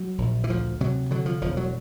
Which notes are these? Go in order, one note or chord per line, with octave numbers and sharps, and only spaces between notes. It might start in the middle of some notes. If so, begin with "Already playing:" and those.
Already playing: F#3
A#1
E3
D2 F3
C3 F#3
D3 F#3
F3
E1 F3
F#3